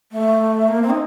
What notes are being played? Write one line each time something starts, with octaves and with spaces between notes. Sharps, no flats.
A3
A#3
C4
D#4